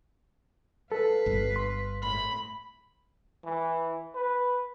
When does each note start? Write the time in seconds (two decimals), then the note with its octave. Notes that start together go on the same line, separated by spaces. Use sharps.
0.92 A4 B4 F5
1.26 G1 G2
1.56 C6
2.02 A2 B5
3.44 E3
4.15 B4